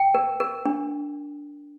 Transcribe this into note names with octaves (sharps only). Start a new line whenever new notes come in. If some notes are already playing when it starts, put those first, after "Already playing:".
Already playing: G5
A#4
A#4
D4